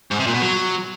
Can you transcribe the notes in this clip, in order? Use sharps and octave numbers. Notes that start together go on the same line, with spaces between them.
G#2
C3
A#2
B2
F#3